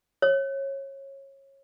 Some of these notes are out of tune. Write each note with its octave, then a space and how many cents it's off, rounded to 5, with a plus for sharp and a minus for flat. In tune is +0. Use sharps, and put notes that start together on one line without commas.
C#5 -20